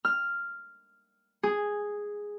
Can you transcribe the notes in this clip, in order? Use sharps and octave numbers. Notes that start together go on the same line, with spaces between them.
F6
G#4